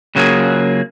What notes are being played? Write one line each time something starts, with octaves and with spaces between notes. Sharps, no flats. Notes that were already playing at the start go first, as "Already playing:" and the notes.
C#3 F#3 A#3 F4 G#4